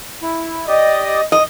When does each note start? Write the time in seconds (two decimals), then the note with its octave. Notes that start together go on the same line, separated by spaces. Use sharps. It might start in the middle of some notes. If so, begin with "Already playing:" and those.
0.22 E4
0.68 G4 D5 D#5
1.32 D#5